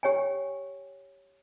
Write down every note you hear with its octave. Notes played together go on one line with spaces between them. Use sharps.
G4 C#5 G5 G#5